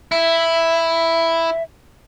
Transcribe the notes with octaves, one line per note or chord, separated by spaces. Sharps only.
E4 E5